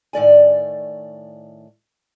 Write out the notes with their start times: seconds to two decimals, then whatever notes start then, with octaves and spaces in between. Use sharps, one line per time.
0.13 A2 D#3 D5 G#5